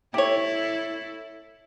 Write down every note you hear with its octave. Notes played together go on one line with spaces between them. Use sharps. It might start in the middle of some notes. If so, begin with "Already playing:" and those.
E4 G4 A4 C#5